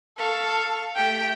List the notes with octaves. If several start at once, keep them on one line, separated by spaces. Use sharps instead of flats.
A4 F5 C#6
A3 G4 G5